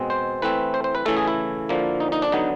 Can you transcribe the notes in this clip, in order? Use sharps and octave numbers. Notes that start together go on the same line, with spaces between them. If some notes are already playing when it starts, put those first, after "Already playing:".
Already playing: B2 G#3 C4
C5
E3 A3 C4 B4
C5
C5
B4
C#3 E3 A3 A4
G#4
E4
D3 F3 A#3
D#4
D#4
D4
D3 F#3 B3 D#4